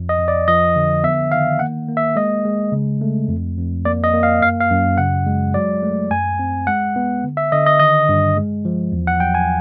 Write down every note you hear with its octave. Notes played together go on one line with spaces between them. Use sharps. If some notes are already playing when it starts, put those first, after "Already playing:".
Already playing: F2 F3
D#5
F2
D5
F3 D#5
D3
B3 E5
D#3 F5
A#3 F#5
A#3
E5
G#3 D#5
G#3
C#3
A3
F2
F2
A#3 D5
D#5
A#3
F5
F#2 F5
F5
F#2
C#3 F#5
G#3
F#3 D5
A3
F#2 G#5
C4
G#3 F#5
B3
D3
E5
D3 D#5
D#5
D#3 D#5
G2
G#3
F3
E2
F#5
F#3 G5
G#5